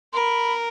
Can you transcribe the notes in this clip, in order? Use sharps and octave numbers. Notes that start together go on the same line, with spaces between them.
A#4 B5 C6